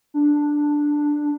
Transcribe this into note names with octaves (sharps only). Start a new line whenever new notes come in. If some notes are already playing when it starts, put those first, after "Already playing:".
D4